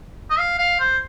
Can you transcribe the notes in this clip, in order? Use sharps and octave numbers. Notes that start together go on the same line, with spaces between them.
D#5
F5
F5
C5